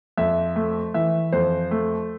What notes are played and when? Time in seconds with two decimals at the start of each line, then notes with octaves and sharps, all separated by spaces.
0.17 F2 E5
0.56 A3
0.94 E3 E5
1.32 F2 C5
1.71 A3